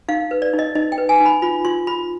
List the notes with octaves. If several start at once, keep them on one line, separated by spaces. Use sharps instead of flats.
D#4 F5
B4
D5
D#4
D#5
D#4 D#5
G5
B4
G#5
D#4
B5
F4 B5
F4 C6
F4 B5